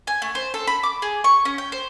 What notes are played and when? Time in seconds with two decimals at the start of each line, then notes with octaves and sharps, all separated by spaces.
0.07 G#5
0.22 A3
0.35 C5
0.54 A4
0.67 B5
0.83 D6
1.02 G#4
1.24 C#6
1.45 C#4
1.58 G5
1.72 C5